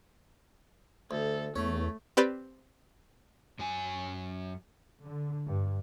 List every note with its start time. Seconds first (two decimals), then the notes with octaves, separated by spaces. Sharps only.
1.11 D2 A4
1.56 E2 A3 C#4
2.17 C4 G4 B4 D5 G5 B5
3.59 F#2 F#3 G#5
5.04 D3
5.45 G2